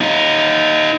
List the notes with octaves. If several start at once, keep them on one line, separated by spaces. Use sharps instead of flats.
D#4 F4